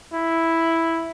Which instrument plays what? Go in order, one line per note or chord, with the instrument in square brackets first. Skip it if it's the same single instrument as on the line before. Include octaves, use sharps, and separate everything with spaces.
[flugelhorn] E4